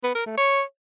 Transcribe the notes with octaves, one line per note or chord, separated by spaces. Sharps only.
B3
A#4
A3
C#5